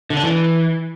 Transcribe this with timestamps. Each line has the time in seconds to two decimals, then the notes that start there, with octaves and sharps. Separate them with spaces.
0.10 D3
0.17 D4
0.23 E3